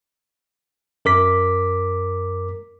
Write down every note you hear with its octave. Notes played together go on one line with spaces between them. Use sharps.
F#2 A#4 D6 B6